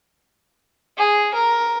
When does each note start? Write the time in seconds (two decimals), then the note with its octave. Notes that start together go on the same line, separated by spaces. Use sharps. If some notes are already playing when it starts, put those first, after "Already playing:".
0.98 G#4
1.34 A#4